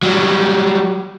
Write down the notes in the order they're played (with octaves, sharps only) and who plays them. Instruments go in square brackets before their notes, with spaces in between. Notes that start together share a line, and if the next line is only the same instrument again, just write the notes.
[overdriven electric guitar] F#3 G3